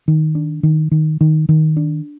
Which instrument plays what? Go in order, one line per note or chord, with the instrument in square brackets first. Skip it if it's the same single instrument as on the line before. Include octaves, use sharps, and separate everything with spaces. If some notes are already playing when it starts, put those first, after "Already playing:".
[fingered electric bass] D#3
D4
D#3
D#3
D#3
D#3
D4